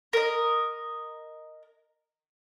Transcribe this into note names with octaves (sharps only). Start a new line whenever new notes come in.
A#4 D#5